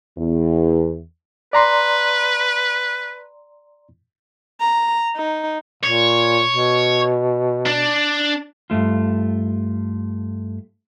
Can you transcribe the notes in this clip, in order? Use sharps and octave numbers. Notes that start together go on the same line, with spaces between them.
E2
B4 D5 A#5 C6
A#5
D#4
A#2 C#5
B2
D4
G2 A#2 A3 F4